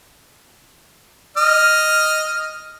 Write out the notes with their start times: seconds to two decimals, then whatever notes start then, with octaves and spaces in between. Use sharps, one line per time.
1.37 D#5 F6